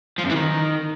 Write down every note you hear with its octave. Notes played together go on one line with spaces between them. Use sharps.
F3
F#2
E3
D#3